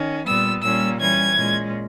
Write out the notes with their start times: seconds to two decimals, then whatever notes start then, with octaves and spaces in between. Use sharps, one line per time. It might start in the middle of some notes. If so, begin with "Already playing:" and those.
Already playing: D#3 C#4
0.26 A#2 G3 B3 E6
0.63 A#2 G3 A#3 C#4 E6
1.00 E3 G3 C#4 G#6
1.37 A#2 G#3 C#4